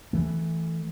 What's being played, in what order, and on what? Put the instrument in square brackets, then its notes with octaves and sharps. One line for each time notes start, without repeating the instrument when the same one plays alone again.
[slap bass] E3 A3